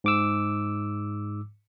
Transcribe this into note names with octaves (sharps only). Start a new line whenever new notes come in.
G#2 D6 E6